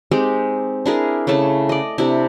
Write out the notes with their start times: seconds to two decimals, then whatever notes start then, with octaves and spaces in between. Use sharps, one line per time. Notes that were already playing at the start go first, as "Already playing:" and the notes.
0.11 G#3 C4 D#4 G4
0.86 D4 E4 G#4 A#4
1.27 C#3 A3 E4 A5
1.69 D5 D#5
1.98 C3 D4 E4